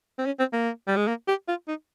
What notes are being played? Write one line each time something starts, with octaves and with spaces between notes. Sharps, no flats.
C4
C#4
C4
A#3
G3
G#3
A#3
G4
F4
D#4